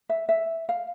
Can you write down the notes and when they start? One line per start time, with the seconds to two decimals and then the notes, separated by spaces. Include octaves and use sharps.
0.09 E5
0.29 E5
0.69 F5